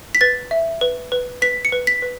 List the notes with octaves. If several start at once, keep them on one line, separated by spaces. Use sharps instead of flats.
B6
B4 A6
E5
B4
B4
B4 B6
C#7
B4
B6
B4